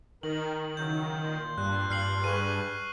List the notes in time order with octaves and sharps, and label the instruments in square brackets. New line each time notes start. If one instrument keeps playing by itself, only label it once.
[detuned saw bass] D#3 [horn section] A#4 [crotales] F#7
[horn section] C#3 E3 F#3 [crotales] G6
[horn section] A#2 C6
[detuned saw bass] G2 [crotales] F#6
[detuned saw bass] G2 [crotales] F6 C7 F#7
[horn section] G#4 B4 [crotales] C#6 D#7